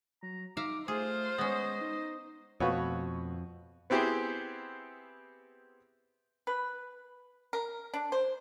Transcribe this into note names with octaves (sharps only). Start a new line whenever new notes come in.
F#3 A#5
D#4 E5 F5 A#5 D6
A3 F4 G#4 C5
G#3 B3 C#4 D#5
D#4
F2 B2 A3 F#4 B4 C#5 F5
B3 C4 E4 G4 G#4 C5
B4
A#4
D4
C5